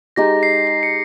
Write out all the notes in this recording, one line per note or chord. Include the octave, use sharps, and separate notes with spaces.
G#3 D#4 G4 A#6
C7
C7
C#7